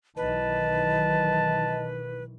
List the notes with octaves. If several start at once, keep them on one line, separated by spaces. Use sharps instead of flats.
B1 D#3 E3 B4 D#5 A5